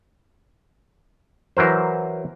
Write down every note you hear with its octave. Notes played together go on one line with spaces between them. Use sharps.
E3 F#3 A#4 C5